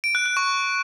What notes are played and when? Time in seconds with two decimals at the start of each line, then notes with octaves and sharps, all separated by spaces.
0.04 D7
0.15 F#6
0.26 F#6
0.37 C#6